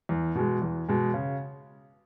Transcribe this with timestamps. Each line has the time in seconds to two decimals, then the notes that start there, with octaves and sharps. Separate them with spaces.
0.09 E2
0.35 B2 G#3
0.62 E2
0.88 B2 G#3
1.14 C#3